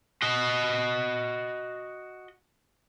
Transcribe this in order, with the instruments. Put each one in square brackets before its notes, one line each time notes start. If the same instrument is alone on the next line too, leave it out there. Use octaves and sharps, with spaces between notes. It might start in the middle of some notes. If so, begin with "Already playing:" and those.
[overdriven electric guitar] F#4 D#5